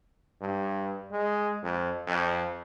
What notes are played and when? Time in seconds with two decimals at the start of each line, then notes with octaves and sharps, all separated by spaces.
0.41 G2
1.11 G#3
1.63 F2
2.07 F2